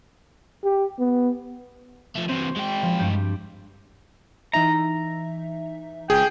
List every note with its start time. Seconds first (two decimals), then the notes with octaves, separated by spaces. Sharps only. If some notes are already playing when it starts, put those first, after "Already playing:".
0.64 G4
0.99 B3
2.15 F3 A3
2.29 C3 E3 C4 F#4
2.56 G#3 G5
2.82 F3
2.99 G2 G3 G4
4.53 E3 D#4 E5 A#5
6.10 C#2 G#4 G5